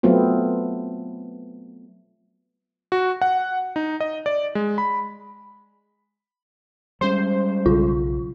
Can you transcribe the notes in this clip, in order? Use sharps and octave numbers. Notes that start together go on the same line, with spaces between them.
F#3 A3 B3 C4 F4
F#4
F#5
D#4
D#5
D5
G#3
B5
G3 G#3 C#4 C5
B1 C#3 F#3 F4